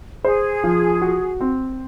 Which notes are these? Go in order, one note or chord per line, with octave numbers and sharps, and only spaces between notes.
G#4 C5
F3
F#4
C4